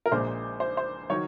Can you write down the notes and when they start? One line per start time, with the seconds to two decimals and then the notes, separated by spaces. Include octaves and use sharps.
0.06 A#4
0.11 A#1 A#2 G#3 C5
0.60 C5
0.77 C5
1.10 D#3 F#3 C#5